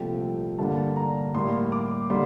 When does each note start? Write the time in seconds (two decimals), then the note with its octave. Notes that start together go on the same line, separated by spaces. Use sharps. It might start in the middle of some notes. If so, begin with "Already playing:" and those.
Already playing: C2 A#2 F3 A3 C4 G5
0.58 G2 D3 G3 A#3 A5
0.96 A#5
1.34 A2 G3 A#3 C6
1.72 D6
2.10 D3 G3 A#3 C6